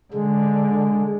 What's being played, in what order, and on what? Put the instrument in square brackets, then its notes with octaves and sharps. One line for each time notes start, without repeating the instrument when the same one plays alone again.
[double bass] D3 [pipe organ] G#3